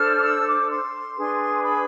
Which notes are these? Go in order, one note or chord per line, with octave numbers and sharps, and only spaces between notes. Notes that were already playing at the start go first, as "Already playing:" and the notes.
Already playing: D4 A4 C5 F6
D6
E6
D6
C6
D4 G#4 B4
B5